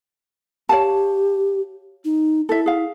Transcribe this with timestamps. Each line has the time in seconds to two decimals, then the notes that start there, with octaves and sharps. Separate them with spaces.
0.69 G4 C#5 F5 A5
2.05 D#4
2.49 E4 A4 E5
2.66 G#4 F5